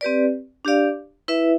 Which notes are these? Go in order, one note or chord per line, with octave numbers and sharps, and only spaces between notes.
C4 G4 B4 D5
D4 G4 D5 F5
E4 B4 E5